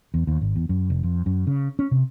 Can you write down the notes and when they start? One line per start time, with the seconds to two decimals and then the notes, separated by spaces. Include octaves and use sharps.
0.14 E2
0.27 D#2
0.41 G#1
0.56 E2
0.69 F#2
0.90 F1
1.03 F2
1.26 F#2
1.47 C#3
1.79 C#4
1.91 C3